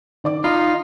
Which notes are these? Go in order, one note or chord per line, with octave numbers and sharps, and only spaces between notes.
D#3 D5 D6
D#4 F4 B5